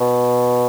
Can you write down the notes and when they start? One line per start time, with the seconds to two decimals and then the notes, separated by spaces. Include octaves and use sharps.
0.01 B2